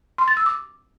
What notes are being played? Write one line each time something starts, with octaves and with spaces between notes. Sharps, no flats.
C6
A6
E6
D6